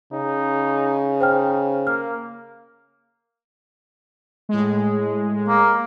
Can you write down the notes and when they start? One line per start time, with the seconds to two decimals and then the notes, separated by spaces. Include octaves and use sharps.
0.13 C#3 D#4
1.21 D#4 C5 G5 F6
1.87 A#3 F6
4.49 A2 G#3
5.48 A#3